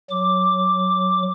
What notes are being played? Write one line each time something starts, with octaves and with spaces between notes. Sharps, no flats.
F#3 D6